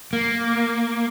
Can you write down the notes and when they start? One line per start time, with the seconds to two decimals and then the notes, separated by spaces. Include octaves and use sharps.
0.13 A#3